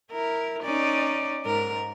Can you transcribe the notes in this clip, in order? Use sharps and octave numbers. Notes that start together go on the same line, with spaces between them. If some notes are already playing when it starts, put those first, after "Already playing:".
E4 A#4
C#4 D#4 D5
G#2 A#4